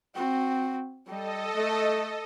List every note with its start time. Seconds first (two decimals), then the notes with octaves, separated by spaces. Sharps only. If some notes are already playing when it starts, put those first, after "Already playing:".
0.15 C4 F#4
1.06 G3 A4 D#5
1.55 A3